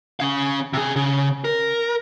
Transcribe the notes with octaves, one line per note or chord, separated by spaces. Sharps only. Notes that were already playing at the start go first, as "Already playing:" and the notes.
C#4 F5
C3 G#4
C#3
A#4